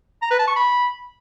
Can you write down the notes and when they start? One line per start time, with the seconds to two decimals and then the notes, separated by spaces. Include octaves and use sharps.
0.22 A#5
0.31 B4
0.39 A5
0.48 C#6
0.56 B5